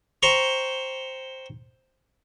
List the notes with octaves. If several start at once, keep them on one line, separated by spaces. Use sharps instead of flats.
C5 G5 A#5 C#6